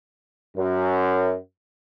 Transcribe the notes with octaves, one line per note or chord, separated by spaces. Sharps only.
F#2